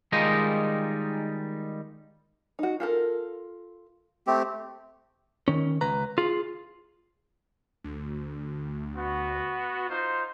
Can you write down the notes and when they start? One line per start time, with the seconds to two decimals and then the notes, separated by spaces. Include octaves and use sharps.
0.12 D#3 G3 G#3 D#4 F4 D#5
2.59 D#4 F#4
2.80 F4 A4 A#4
4.27 A3 C4 G4
5.48 D#3 C#4
5.81 C#2 B4 A#5
6.18 F4 G#4
7.84 D2
8.96 B3 F#4
9.88 D#4 F4 C5